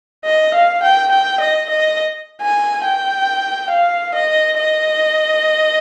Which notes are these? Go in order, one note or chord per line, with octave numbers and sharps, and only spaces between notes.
D#5
F5
G5
G5
D#5
D#5
G#5
G5
F5
D#5
D#5